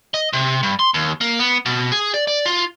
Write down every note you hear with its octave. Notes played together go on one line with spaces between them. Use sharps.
D#5
C3
G2
C6
D#2
A#3
B3
B2
G#4
D5
D5
F4